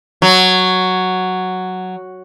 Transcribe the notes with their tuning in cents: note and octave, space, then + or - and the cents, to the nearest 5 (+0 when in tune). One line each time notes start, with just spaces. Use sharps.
F#3 +0